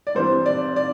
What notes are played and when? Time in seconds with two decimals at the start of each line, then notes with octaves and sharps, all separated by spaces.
0.07 D5
0.15 G2 E3 G3 C4 C5
0.46 D5
0.76 D5